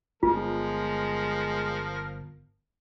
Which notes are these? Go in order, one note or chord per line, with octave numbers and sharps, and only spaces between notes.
G1 F3 G#3 B3 F4 A#4